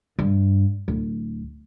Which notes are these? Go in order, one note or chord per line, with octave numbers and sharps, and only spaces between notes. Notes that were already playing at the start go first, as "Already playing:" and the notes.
G2
D1